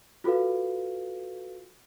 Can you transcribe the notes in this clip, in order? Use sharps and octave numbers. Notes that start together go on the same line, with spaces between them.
F4 F#4 A4 B4 F5